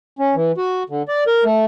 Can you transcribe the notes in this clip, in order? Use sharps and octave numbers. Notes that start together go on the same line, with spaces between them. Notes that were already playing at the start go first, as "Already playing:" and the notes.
C#4
E3
F#4
D3
D5
A#4
A3